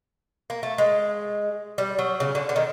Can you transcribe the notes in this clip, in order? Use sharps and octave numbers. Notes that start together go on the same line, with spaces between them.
A#3
A3
G#3
G3
F#3
C#3
D3
D3
D#3